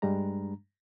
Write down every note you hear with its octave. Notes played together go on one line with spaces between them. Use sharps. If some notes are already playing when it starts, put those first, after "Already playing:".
G2 G3 G#3 D4 A#5